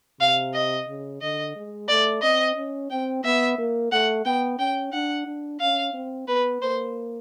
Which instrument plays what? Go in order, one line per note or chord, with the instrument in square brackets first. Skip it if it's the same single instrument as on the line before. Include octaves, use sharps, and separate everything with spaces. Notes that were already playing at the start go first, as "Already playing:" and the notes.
[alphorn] C3 [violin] F5
[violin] D#5
[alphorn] C#3
[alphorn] D3 [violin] D#5
[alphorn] G#3
[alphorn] A3 [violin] D5
[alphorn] C4 [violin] D#5
[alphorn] C#4
[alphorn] C4 [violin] G5
[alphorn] B3 [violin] E5
[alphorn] A#3
[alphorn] A3 [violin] F#5
[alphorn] B3 [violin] G5
[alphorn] C#4 [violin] G5
[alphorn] D4 [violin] F#5
[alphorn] D4
[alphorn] C#4 [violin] F5
[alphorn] C4
[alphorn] B3 [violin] B4
[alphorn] A#3 [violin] C5